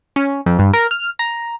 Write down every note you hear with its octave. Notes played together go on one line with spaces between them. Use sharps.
C#4
F2
G2
A#4
F6
A#5